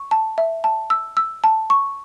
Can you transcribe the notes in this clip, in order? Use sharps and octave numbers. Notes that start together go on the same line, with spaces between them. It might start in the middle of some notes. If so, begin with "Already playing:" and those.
Already playing: C#6
A5
E5
A5
E6
E6
A5
C#6